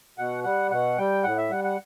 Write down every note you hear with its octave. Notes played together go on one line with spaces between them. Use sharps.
B2 F#5
G3 F#5
B2 F#5
G3 G5
A2 F#5
E5
G3 F#5
F#5